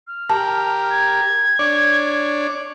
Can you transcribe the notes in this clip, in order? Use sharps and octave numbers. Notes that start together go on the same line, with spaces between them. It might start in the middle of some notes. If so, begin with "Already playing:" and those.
F6
G4 A#4 A5
G#6
D4 C#5 D5